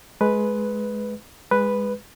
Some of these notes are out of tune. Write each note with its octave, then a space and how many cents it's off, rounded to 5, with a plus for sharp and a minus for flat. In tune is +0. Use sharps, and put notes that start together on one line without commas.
G#3 +20 B4 +0
G#3 -20 B4 +0